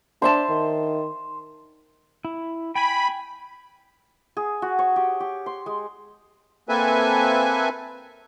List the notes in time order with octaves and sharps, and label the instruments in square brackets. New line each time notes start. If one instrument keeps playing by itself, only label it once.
[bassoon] D4 [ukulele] C5 E5 A5 [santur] C6
[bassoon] D#3
[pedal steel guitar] E4
[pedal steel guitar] G5 G#5 [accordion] B5
[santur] G#4
F#4
C#5
G4
G4
C6
G#3
[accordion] A#3 C4 A4 B4 E5 G#5